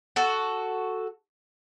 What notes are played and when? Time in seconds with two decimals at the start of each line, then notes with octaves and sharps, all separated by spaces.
0.16 F#4 A4